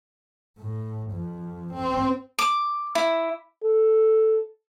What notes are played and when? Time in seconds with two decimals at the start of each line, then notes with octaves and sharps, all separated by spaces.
0.58 A2
1.11 F2
1.73 C4
2.39 D6
2.95 E4
3.63 A4